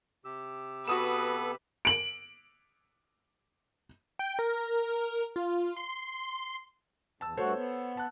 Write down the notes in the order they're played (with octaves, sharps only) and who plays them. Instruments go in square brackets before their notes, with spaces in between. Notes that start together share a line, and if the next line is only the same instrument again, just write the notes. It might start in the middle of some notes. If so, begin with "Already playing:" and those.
[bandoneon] C3 G4 E6
[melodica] B3 A4 [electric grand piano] F#4 D#6 E7 [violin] B4
[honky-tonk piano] D7 F#7
[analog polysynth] G5
A#4
F4
C6
[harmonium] E2 [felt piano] A5 E6
[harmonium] G2 A3 F#4 [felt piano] A4 C5 C#5
[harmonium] B3
[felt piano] A5 F#6